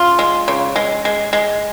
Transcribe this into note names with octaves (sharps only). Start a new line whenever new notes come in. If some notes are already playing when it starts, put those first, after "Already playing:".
Already playing: C#3 F4
G#3
C#3
G#3
G#3
G#3